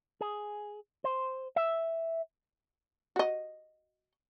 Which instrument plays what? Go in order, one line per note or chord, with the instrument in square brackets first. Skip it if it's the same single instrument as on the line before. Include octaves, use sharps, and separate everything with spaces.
[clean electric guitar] G#4
C5
E5
[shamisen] F#4 D#5